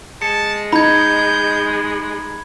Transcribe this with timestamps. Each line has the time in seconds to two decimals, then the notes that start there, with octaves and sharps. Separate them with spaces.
0.22 G#3 A5 C#7
0.72 D#4 B5 G6 G#6